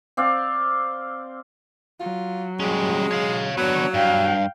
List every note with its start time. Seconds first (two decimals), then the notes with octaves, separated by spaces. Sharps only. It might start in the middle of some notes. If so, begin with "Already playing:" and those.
0.17 C4 D5 F5
2.00 F#3 F4
2.60 G3 G#3 C#4
3.11 C#5 F5
3.57 F#3 B3 D4 C#5
3.94 G2 F5 G5